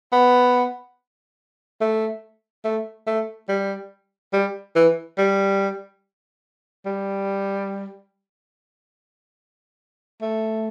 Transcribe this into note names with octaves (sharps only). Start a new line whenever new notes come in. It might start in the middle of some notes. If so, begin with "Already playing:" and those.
B3
A3
A3
A3
G3
G3
E3
G3
G3
A3